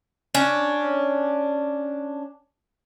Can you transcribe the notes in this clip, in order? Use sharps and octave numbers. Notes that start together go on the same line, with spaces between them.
C#4 D4